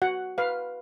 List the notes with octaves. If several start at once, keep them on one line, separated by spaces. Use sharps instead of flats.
F#4 F#5
B4 F5